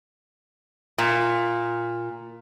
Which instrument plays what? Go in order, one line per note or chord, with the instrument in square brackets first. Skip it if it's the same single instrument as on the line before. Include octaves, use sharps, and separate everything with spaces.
[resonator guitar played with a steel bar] A#2